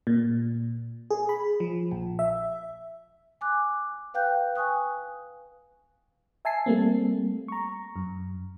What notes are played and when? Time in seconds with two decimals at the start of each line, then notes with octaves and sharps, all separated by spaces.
0.07 A#2
1.10 G#4
1.29 B5
1.60 F3
1.91 A#1
2.19 E5
3.41 G#5 D6 F#6
4.14 B4 F5 G5 F#6 G6
4.56 G#5 C#6 D#6 F#6
6.45 E5 G#5 A5 C7
6.66 G3 A3 A#3 C4
7.48 A#5 C#6
7.96 F#2